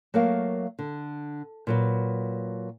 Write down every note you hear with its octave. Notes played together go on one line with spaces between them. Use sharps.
F#3 A3 A#3 A#4 F5
D3
A#2 F#3 B4